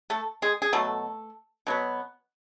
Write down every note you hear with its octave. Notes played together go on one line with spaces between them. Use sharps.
A3 A4
G#3 G#4
G#4
B2 F#3 A3 A4
B2 F#3 B3